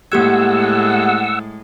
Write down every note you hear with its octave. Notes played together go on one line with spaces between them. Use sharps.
A2 G#3 A#3 G4 F#5 E6 G#6